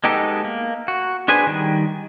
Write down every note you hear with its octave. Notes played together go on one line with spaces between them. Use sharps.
G#3 B3 D#4 G4 A4
A#3
F#4
D4 G#4 B4 C5 G#5
D#3 G3